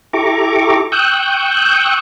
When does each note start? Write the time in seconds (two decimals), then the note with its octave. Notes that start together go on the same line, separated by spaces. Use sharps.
0.13 E4 G4 A4 A#5 C#6 D6
0.92 G5 C#6 D#6 E6 F#6 G6